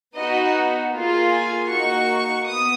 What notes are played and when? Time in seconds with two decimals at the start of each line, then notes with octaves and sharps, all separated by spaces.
0.16 B3 D#4 F#4 D#5
0.94 A#3 F4 G#4
1.31 G#5
1.69 A#3 D#4 F#4 C#6
2.46 B3 D#6